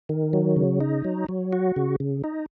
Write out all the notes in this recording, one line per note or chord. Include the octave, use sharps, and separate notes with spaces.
D#3
F#3
C#3
D#4
F#3
F#3
F#4
C#3
C#3
D#4